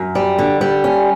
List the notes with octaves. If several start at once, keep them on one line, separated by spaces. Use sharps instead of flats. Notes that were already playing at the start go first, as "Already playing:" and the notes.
Already playing: F#2
G3
D3
G3
C#4